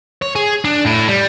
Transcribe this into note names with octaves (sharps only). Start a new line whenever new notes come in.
C#5
G#4
D4
A2
G3